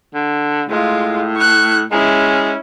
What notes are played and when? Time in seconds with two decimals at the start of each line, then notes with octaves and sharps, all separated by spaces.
0.14 D3
0.69 A2 G#3 F4
1.36 C#6 F#6
1.92 G#3 C#4 E4